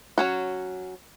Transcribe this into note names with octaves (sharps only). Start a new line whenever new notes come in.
F#3 C#4 F#4